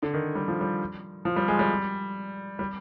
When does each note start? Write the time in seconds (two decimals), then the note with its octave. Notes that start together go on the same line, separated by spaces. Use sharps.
0.03 D3
0.14 D#3
0.35 G3
0.48 F3
0.61 G3
1.25 F3
1.36 G3
1.48 G#3
1.59 G3
2.59 G3